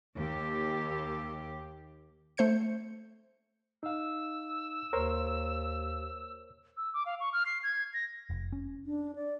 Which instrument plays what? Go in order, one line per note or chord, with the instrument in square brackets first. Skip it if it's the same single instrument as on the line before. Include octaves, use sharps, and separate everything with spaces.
[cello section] D#2 G4
[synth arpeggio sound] A3 C5 G6 C#7
[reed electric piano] D#4 F5 [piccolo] E6
[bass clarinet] D#2 [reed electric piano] A#4 C5 C#5
[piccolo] E6
D6
F5
C#6
F6
C7
G#6
A#6
[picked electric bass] F1
C#4
[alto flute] D4
D5